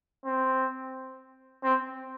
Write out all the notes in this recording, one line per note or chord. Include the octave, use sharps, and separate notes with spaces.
C4
C4